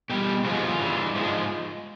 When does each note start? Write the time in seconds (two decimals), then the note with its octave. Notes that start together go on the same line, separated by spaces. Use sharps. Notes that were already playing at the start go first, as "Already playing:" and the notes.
0.10 B2 G3 G4
0.44 F2 C#3 F3 G#3 F4
0.54 F#4
0.64 F4
0.79 G2 E3 G3
1.15 G#2 F3 G#3 E4
1.23 D4